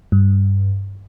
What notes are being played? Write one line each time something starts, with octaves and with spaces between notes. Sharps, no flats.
G2